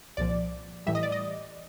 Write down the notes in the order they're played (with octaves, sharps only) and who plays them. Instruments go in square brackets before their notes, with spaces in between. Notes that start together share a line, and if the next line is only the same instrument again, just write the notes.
[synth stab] C2 A#2 F3 D5
A2 E3 G3 E5
D#5
D5
D#5